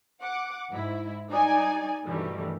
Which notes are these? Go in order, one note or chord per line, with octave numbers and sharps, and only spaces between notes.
F#5 D6
G#2 E4
G3 D#4 D5 G#5
G2 B2 D#3 E3 G3 A3